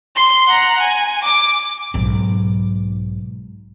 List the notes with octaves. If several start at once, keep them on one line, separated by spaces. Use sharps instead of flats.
C6
F#5 A#5
G#5
D6
B1 G#2